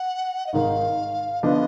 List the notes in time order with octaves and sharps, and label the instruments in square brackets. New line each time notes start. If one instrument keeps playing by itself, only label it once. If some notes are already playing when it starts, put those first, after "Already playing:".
Already playing: [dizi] F#5
D#5
[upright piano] G#1 G#2 D#3 [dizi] F5
[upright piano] D3 F3 B3 D4 F4 [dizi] D#5